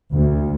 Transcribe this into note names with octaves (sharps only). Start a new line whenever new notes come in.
D2